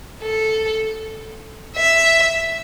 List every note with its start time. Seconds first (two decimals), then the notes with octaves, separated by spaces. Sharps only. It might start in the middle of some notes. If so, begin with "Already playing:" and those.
0.23 A4
1.76 E5